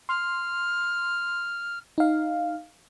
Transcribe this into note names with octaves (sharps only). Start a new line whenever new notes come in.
C6 F6
D#4 F5